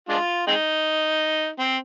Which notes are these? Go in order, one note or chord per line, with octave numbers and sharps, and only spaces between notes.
G#3 D4 F4
G#3 C4 D#4
C4